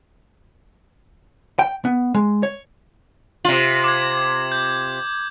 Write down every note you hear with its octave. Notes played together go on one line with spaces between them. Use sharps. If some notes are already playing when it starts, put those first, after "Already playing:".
G5
B3
G#3
C#5
C3 F4 F#7
D6 G#6
G6